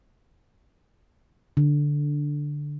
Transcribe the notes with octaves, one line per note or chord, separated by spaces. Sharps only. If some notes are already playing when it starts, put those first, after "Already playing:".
D3